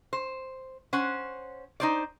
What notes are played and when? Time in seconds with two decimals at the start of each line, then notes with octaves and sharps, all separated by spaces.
0.13 C5
0.93 C#4 C5 F#5
1.80 D#4 C5 D5